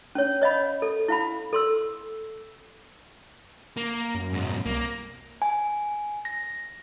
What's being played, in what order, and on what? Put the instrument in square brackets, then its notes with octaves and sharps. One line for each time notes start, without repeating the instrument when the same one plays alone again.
[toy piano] C#4 C#5
C#5 D#5 F5 B5
A4
E4 F5 B5
A4 C6 E6
[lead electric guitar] A#3
[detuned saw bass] F#2
[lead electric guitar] G#2 B2
[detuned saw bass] C2 [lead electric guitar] A#3
[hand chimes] G#5
A#6